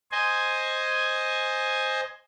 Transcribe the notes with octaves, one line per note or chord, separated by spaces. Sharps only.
C5 D#5 G#5